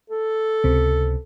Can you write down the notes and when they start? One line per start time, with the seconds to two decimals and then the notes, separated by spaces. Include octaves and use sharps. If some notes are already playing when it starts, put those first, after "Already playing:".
0.10 A4
0.64 C#2 C3